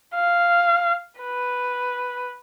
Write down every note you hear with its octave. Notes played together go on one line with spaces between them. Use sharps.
F5
B4